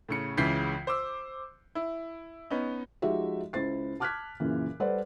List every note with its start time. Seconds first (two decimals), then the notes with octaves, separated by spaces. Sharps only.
0.09 A2 C#3 C#7
0.37 C#2 C#3 E3 G6 B6 C7
0.87 C5 D6 E6
1.75 E4
2.51 B3 C#4 D#4
3.02 F3 G#3 D#4 F#4 G4 E5
3.53 C#2 E4 C5 A6 C7
4.00 A5 D6 F6 F#6 G#6 B6
4.40 F#2 A#2 C#3 E3
4.80 G3 A4 B4 C5 D5 F#5